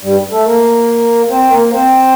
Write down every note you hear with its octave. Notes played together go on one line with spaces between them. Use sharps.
G2 G3
A3 A4
A#3 A#4
C4 C5
A#3 A#4
A#4
C4 C5